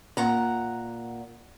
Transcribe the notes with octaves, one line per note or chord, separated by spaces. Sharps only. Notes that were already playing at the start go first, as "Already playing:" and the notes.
A#2 F#5 A#5